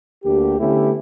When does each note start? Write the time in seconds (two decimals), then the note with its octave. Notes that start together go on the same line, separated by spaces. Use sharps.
0.24 D2 D3 A#3 G4
0.59 D3 A3 B3 C#4 E4 G4